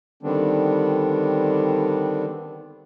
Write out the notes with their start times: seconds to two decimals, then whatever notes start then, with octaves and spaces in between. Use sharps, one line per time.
0.23 D3 D#3 G3 B3 C4 D4